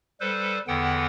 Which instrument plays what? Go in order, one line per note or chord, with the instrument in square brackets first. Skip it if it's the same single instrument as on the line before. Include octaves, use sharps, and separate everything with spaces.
[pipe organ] G3 A4 B4 C5
E2 D3 E3 B3 F#5 G5